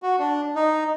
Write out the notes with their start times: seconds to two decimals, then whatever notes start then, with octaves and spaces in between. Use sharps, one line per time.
0.03 F#4
0.19 D4
0.55 D#4